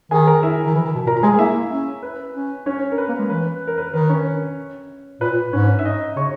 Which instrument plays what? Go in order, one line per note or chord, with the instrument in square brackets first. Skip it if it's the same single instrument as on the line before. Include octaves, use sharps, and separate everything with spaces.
[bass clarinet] D#3 [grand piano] G#4 G#5
[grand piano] A#4 A#5
E4 E5
[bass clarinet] D#3
E3
D#3
B2
[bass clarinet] A#2 [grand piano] A#4 A#5
[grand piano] A#5
[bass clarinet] G#3 [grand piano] G#4 G#5
[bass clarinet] A#3 [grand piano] E4 E5
[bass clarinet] C#4
[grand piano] B4
[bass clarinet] C#4
[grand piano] C#4 C#5
A#4
B4
[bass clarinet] A#3
G#3
[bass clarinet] E3 [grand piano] B4
[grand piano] A#4
B4
[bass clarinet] D#3 [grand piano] B4
[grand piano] C#4 C#5
[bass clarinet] A#2 [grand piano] B4
[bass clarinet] G#2 [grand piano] C#4 C#5
[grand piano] E5
D#4 D#5
[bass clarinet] C#3 [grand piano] C#5 C#6